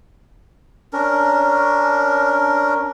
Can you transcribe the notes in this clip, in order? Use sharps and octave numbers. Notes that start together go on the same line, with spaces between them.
C#4 D4 A#4